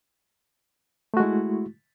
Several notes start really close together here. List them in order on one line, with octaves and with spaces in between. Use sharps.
A3 F#4 G#3 E4